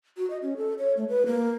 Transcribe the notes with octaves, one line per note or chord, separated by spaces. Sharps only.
F#4
D#5
C#4
A4
C#5
A3
B4
A#3